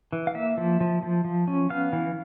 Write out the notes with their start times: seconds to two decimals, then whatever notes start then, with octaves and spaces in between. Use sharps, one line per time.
0.13 E3
0.27 F5
0.35 A#3 E5
0.57 F3
0.80 F3
1.03 F3
1.25 F3
1.47 C#4
1.70 B3 F5
1.93 E3